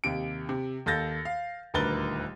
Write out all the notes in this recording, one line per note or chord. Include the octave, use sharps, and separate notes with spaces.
D#2 C3 D7
C3
D#2 A4 G6 A6 A#6
F5
D#1 D2 A#4 B4 A6 G7